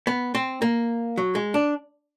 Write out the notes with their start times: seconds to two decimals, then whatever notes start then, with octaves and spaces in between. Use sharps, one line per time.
0.07 B3
0.35 C4
0.62 A#3
1.18 F#3
1.35 G#3
1.54 D4